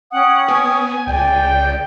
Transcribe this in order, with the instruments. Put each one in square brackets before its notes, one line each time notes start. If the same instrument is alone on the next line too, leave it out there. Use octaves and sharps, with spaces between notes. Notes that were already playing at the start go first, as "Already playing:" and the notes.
[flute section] C#4 G5 D#6 [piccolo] F#5
[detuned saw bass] B3 [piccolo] G#5
[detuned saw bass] C#2 [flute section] D5 [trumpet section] G5
[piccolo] G6